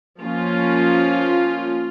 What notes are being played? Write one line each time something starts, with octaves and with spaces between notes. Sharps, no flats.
F3 A#3 C#4 F4